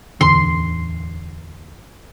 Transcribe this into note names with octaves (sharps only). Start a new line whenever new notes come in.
D1 E2 D3 C6